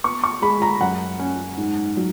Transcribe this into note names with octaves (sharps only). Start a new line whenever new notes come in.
B3 C#6
C#6
G#3 B5
A#5
F#2 F#5
C#4
G#2
F#3